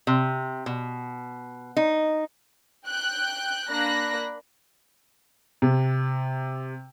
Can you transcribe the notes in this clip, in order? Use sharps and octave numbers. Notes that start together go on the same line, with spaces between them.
C3
B2
D#4
G5 F#6 G6
A#3 D4 B5 F#6 A#6
C3